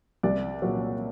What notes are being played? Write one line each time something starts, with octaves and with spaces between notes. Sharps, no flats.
C2 D5
A#2 F#3